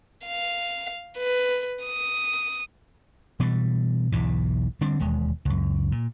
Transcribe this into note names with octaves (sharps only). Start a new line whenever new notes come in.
F5
B4
D#6
B2 E3 G3
B1 E2 G#2 E3
D3 G3 C4 D4
E1 D#2 G#3
C#2 F#2
A#2